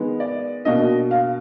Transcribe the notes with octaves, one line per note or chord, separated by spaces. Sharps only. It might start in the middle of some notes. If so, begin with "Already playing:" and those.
Already playing: D#3 G#3 B3
D5
B2 A#3 D4 D#5
F5